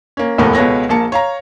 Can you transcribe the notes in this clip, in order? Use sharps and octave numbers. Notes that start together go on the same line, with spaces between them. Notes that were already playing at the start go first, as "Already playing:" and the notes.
A#3 C#4
F1 D#2 A2 A3 B3 A#4
C#2 B2 A4 B4 C#5 A#6
A#1 A#3 A5 C#7
C#5 F5 A#5